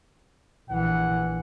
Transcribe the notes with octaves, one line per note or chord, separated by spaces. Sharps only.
A#1 E3 F#5